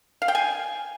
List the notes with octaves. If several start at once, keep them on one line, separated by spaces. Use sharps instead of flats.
F5
G5
G#5